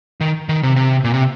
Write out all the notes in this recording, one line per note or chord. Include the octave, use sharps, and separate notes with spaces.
D#3
D#3
C3
C3
A#2
C3